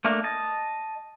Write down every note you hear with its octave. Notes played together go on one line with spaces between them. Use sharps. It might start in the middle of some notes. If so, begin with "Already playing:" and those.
A3 A#3 D4 A#4
D#5 A5